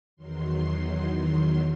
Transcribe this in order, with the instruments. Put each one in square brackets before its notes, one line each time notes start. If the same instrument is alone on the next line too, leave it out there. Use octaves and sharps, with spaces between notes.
[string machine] E2 D#3 F#3 C6